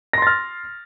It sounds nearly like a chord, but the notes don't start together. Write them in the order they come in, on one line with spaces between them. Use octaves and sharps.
A#6 C6 A6 F6